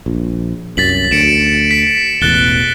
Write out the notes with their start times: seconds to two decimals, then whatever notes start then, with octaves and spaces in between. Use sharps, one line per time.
0.06 A#1
0.77 C2 F#2 A6 B6 F#7
1.11 D2 C#7 D7 E7
1.71 B6
2.21 E1 A1 E2 F#6 A6 G7